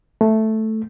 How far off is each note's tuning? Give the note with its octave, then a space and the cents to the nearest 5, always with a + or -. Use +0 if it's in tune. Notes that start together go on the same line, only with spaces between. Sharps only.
A3 +0